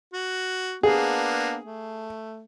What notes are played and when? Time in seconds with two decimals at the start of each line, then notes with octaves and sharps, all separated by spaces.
0.13 F#4
0.83 A#3 B3 D4 G#4
1.66 A3